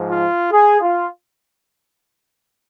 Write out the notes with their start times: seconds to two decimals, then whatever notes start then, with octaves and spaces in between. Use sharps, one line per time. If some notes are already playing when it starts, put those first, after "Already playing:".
Already playing: G#2 F3
0.08 F4
0.51 G#4
0.81 F4